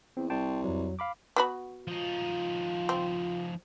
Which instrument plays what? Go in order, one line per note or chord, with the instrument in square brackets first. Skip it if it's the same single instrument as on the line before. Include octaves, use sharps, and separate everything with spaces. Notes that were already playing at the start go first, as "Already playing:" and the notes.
[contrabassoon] E2 [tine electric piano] C4
[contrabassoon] C2 [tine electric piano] G5 A5 C6
[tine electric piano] F2 F#3
F5 B5 D6
[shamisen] B3 F#4 B5
[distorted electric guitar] F3 D#4 [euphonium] F4
[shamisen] C4